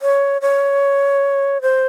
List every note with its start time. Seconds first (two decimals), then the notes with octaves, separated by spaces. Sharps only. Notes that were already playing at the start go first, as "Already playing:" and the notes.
0.02 C#5
0.42 C#5
1.62 C5